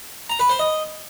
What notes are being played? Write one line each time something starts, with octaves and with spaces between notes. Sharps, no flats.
A#5
B4
C5
D#5